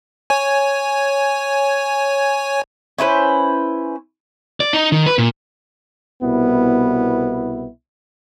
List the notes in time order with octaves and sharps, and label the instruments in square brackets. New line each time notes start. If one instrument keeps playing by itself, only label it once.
[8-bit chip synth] C#5 G#5
[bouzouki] C#4 E4 B4 C5
[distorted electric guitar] D5
D#4
D#3
B4
A#2
[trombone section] C2 B2 B3 E4